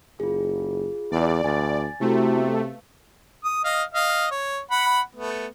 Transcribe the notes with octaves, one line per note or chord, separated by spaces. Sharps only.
F#1 F4 G#4
E2 D5
D2 G#5 A6
C3 A3 E4 F#4
B3
D#6
D#5 F5
D#5 F5
C#5
F#5 B5
A3 B3